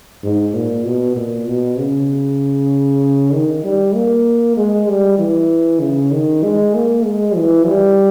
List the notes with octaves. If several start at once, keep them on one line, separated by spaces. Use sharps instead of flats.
G#2
A#2
B2
A#2
B2
C#3
D#3
G3
A#3
G#3
G3
E3
C#3
D#3
G#3
A#3
G#3
E3
G3